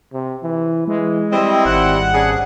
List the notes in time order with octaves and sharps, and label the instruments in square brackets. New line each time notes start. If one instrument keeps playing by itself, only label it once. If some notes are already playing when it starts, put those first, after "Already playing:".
[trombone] C3
E3
[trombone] E3 [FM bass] G#3
[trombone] G3 [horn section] C4 E4 [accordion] D#5
[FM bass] G#1 [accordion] F#5
[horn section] C#3 D4 G#4